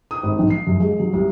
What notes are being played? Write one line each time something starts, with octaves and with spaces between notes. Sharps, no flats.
D#6
G#1
B1
C7
F#2
G#3
F#3
C2